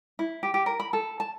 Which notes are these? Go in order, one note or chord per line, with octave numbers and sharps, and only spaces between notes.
E4
G4
G4
A#4
B5
A4
A5